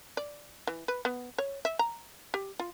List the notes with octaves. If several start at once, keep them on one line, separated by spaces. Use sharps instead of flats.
D5
E3
B4
B3
C#5
E5
A#5
G4
F4